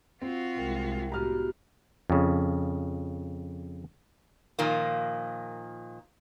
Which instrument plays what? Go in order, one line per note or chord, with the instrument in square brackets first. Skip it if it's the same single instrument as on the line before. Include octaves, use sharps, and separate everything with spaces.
[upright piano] C4 [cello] F4 F#4
[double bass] C2 G#3 [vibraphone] A#4 G5
[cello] A2 [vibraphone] B3 F#4 G4 [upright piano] A#5 F6
[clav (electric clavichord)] F2 C#3
[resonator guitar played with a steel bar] A#2 D#3 F3 A#3